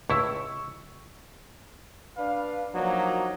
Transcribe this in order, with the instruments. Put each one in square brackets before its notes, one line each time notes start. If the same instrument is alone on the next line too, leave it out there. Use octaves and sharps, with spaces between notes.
[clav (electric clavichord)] C#2 A2 E4 [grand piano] C#6 E6
[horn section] D4 B4 F5
F3 F#3 A#3 D4 D#4